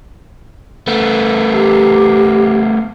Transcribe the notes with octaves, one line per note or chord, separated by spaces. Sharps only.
A3 B3
G4